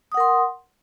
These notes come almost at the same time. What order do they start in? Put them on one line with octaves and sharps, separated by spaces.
D#6 F#5 A#4 C6